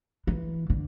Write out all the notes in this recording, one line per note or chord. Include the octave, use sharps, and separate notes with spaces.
E3
D3